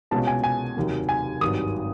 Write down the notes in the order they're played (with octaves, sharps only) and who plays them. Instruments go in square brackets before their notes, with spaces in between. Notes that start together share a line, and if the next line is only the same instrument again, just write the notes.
[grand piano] C2 B2 G#3 C#4 F4 A5
G#5
G#5
F1 D#2 D#3 F#3
G#5
G#1 G2 D#3 F#3 D#6